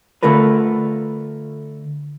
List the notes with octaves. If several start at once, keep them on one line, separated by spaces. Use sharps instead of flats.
D3 A3 F4 A#4 B4